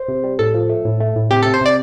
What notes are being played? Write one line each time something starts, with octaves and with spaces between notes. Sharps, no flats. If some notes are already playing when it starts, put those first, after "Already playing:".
Already playing: C5
C3
G3
A2 A4
F3
A3
A2
A3
A2
C3 G4
C3 A4
C5
C3 D5